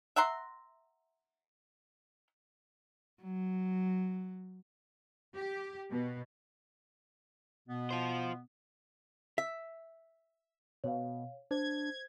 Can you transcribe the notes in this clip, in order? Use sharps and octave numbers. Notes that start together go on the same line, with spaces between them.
E5 F#5 A#5 C6
F#3
G4
B2
B2 B3
F4 C5
E5
B2 C#5 F5
D4 C5 G#6